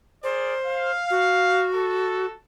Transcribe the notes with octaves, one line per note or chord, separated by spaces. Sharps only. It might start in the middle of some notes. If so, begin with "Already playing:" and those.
G#4 A#4 C5 D5
F5
F#4
A4